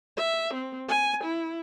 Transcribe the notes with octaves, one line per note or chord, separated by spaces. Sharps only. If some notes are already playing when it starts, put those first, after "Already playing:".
E5
C4
G#5
E4